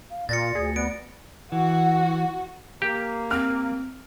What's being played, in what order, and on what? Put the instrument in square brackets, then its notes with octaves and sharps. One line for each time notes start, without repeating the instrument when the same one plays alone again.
[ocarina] F5
[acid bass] A#2 [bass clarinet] F4 [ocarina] D5 [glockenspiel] A6 A#6 C#7
[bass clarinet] D2 [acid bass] G#4
[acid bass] B3 [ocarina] D5 [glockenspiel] D7
[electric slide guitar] E3 [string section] F#4
[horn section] A#3 [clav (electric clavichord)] G4
[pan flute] C4 [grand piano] F6